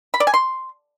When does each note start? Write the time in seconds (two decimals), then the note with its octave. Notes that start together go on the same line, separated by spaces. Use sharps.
0.14 B5
0.20 D5
0.27 G#5
0.34 C6